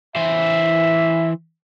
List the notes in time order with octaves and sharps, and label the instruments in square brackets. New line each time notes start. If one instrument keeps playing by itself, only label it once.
[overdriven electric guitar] E3 C5 [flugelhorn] E5